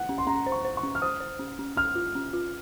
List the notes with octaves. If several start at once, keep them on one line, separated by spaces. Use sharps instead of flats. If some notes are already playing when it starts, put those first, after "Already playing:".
Already playing: F#5
C#4
C6
C#4 A#5
C5
C#6
C5
C#6
C#4
F6
C5 D#6
C5
C#4
C#4
C#4 F6
F4
C#4
F4